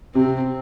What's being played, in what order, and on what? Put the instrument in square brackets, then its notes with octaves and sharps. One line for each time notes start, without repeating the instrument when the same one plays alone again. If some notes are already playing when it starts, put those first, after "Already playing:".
[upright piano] C3 [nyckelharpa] C4